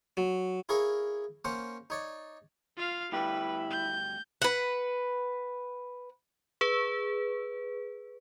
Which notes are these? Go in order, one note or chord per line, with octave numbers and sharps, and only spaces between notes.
F#3
E4 G#4 A#4 C#5 F5
A#3 C#4 C5 F#5
D#4 C#5 D5
F4 F5
D2 G2 E4 G4 B4
G6
B4 F#5
G#4 B4